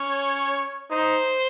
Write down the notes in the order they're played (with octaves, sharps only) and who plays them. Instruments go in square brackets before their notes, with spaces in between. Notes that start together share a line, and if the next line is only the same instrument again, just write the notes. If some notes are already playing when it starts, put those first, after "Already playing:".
Already playing: [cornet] C#4 [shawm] C#5
[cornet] D#4 [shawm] C5